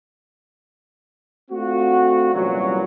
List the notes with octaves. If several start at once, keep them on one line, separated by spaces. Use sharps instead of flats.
A3 C4 D4 F4 F#4
C2 F#2 A#2 E3 F#3